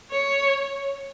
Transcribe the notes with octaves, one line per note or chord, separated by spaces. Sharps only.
C#5